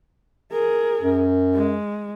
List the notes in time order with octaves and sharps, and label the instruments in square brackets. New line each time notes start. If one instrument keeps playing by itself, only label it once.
[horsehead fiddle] G#4 A#4
[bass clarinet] F#2
[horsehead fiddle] G#3